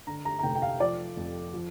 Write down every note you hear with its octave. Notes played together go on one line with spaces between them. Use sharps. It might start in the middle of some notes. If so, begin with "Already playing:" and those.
D3 A#5
A#5
A#5
F1 G5
G5
F5
F3 D5
F2
F3